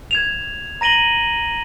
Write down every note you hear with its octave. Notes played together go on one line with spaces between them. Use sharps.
G#6 E7 F7
A#5 A#6 D#7 F#7 G7